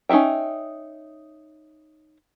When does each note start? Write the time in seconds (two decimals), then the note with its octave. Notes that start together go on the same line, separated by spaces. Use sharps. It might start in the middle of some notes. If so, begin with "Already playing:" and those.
0.09 C#4 D#4 A4 E5 G5